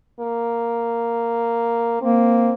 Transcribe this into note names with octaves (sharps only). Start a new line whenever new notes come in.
A#3
A#3 C4